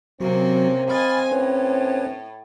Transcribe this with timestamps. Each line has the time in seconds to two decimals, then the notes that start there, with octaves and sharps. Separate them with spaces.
0.20 C3 F#3 A#3 C4 C#4 F#4
0.90 D#5 F5 G#5 B5 F6 A6
1.32 A2 C#4 B4 C#5